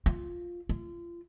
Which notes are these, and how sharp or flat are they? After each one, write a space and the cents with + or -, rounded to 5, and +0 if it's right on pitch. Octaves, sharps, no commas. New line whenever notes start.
F4 +0
F4 -30